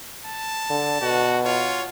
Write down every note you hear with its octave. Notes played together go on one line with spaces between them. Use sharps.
A5
D3
B2 F#4
F4 C#5